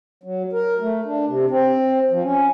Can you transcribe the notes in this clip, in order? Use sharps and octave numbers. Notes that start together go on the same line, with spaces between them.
F#3
A#4
A3
D4
C3
C4
F3
C#4